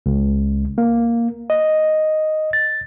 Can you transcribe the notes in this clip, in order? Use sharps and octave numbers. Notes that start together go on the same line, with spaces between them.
C#2
A#3
D#5
A6